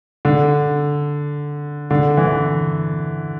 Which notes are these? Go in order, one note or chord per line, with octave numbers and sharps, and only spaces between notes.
D3
D3
E3